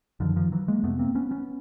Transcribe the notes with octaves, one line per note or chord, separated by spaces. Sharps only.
F#2 D3 D#3 F3
D#3 F3
E3 F#3
G#3 A#3
F2 C3 A3 B3
A#3 C4
B3 C#4
B3 C#4